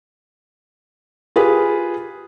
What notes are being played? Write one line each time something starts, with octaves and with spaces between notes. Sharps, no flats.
F4 G4 G#4 B4